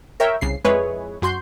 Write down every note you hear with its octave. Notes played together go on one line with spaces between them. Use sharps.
A#4 C#5 E5 G5
C2 C#3 C7
F2 G#3 E4 G#4 B4 C#5
F#2 F#4 C6 G6